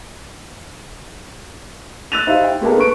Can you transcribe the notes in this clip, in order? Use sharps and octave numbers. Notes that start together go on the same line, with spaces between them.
E6 F#6 A6 D#7 F7
D#4 E4 G4 C5 F5
G5
G#3 A#3 B3 A4
D4 B4 C#6 D7